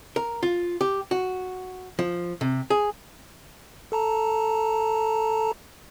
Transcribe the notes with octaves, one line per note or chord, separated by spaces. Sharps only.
A#4
F4
G4
F#4
F3
C3
G#4
A4 A5 A#5